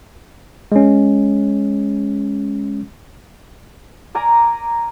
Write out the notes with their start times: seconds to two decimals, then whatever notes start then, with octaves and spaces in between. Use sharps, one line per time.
0.72 G#3 C#4
4.15 A#4 D5 G#5 A#5